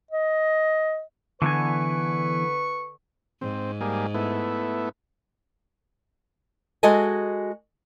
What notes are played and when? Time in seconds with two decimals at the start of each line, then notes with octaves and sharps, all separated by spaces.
0.11 D#5
1.42 D3 E3 B3 B4 G#5 C#6
3.41 G#2 C4
3.81 G3 A#3 G#4
4.14 A3 B3 E4
6.83 G#3 F#4 A4 D#5 G#5